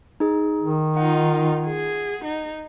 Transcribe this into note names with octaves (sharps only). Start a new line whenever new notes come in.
D#4 G#4
D#3
D#4 F4 F#5
G#4
D#4